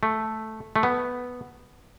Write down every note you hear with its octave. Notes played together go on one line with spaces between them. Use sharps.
A3
A3
B3